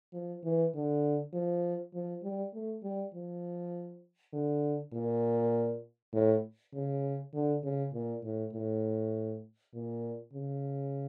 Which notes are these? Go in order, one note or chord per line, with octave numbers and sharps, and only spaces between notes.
F3
E3
D3
F3
F3
G3
A3
G3
F3
D3
A#2
A2
C#3
D3
C#3
A#2
A2
A2
A#2
C#3